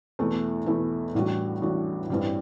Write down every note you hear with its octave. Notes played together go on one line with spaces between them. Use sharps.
E2 B2 A3 E4
E2 B2 A3 E4
A1 A2 G3 D4 F#4
A1 A2 G3 D4 F#4
A1 G2 E3 G3 C4